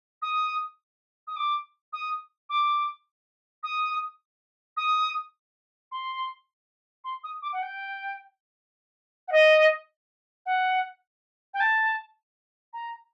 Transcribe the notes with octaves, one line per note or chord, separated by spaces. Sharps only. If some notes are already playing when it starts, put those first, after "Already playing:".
D#6
D#6
D6
D#6
D6
D#6
D#6
C6
C6
D#6
D6
F#5
G5
F#5
D#5
F#5
G5
A5
A#5